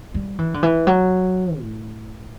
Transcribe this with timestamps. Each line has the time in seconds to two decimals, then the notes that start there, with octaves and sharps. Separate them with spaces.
0.14 G3
0.39 E3
0.54 D3
0.63 E3
0.87 F#3
1.60 A2